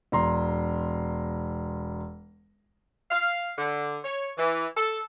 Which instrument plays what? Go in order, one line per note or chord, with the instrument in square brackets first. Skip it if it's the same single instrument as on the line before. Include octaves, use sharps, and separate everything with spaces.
[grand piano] E1 A#5 C6
[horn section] F5
D3
C#5
E3
A4